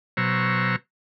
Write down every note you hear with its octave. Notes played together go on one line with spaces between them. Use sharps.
B2 F#3 C5 A#5 C#6 E6